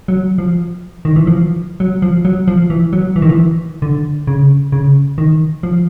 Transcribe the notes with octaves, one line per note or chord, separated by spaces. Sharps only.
F#3
F3
D#3
E3
F3
F#3
F3
F#3
F3
E3
F#3
E3
D#3
E3
D3
C#3
C#3
D#3
F3